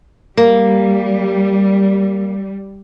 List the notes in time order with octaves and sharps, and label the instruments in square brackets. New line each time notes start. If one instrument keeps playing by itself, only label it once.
[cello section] G3 [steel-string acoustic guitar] A#3